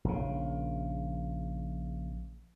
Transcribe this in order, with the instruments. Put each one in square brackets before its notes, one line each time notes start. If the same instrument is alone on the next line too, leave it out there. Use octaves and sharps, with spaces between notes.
[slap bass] A#1 C#3